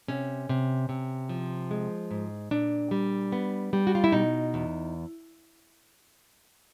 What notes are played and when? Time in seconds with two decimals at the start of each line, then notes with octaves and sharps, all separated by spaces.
0.08 C3 C#4
0.49 C3
0.89 C3
1.29 F3
1.71 G#3
2.11 G#2
2.51 A#2 D4
2.91 G3
3.32 B3
3.73 G3
3.87 F#4
3.95 F4
4.04 E4
4.12 B2 D#4
4.54 E2